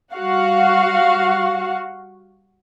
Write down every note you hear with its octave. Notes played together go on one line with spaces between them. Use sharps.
G3 F#4 F5 F#5